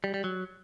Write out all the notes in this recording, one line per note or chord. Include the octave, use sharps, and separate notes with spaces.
G3
G3
F#3